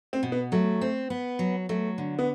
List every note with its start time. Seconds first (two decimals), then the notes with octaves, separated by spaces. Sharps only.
0.13 C4
0.23 B2
0.32 B3
0.52 F#3 A3
0.81 C4
1.10 B3
1.39 F#3
1.69 F#3 A3
1.98 D3
2.19 B3